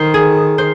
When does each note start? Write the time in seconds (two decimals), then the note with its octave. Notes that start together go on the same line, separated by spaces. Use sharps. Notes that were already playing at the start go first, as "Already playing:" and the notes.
Already playing: D#3 C5
0.14 G#4
0.58 C5